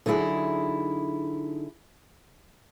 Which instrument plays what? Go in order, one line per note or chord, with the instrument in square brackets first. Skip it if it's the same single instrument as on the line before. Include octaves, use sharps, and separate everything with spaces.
[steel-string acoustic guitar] D3 F#3 D#4 E4 G#4